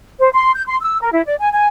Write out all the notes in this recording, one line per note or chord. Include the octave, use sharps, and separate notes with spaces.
C5
C6
G6
C6
E6
A#4
E4
D5
G#5
G#5